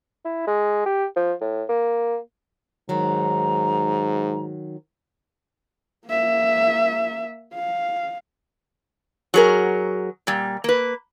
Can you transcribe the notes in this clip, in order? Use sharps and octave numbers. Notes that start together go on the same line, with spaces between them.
E4
G#3
G4
F3
A2
A#3
G#2 D#3 F#3 A#5
A#3 E5
F5
F#3 G#4 A#4
A#2 G3
A#3 B4